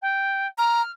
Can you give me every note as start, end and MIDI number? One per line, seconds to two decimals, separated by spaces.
0.02 0.47 79
0.58 0.82 82
0.58 0.91 89